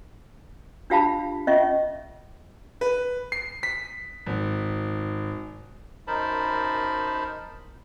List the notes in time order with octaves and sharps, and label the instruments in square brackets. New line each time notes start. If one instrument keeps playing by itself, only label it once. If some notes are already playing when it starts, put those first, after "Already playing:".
[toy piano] D4 F4 G4 F5 A5 B5
C#4 F4 D#5 E5 C#6
[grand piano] B4
C7
B6
G#1
[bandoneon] F#2 D#4 A#4 C5 A5 B5